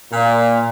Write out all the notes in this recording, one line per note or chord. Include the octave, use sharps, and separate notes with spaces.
A#2